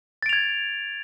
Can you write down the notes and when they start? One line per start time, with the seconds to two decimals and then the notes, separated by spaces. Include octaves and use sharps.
0.23 A6
0.26 D7
0.29 F7
0.33 G#6